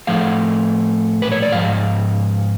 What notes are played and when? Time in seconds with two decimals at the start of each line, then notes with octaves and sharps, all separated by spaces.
0.07 A2 F3 A3 F5
1.22 B4
1.32 C#5
1.42 D5
1.52 G#2 F3 F5